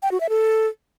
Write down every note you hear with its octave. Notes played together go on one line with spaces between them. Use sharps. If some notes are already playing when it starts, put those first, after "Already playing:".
G5
F#4
E5
A4